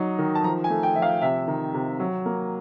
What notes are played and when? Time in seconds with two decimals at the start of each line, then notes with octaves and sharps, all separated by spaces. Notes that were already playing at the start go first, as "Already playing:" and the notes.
Already playing: F#3 D#4
0.19 D#3
0.35 A5
0.44 F3 A#5
0.64 G#5
0.70 A3
0.83 G5
0.96 F3 E5
1.02 F5
1.22 C3 E5
1.48 D#3
1.74 C3
2.00 F#3
2.26 A#3